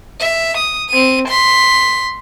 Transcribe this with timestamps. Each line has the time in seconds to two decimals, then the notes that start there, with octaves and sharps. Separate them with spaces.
0.20 E5
0.57 D#6
0.90 C4 D#7
1.28 C6 B6